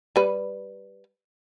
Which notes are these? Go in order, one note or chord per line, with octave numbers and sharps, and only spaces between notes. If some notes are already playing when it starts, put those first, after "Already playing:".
G3 B4